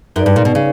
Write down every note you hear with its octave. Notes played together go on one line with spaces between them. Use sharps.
F#2 D#4 G#4 B4 D5
G2
A#2
B2
C#3